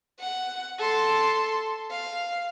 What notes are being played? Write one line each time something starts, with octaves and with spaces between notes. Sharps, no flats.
F#5
A4 C6
F5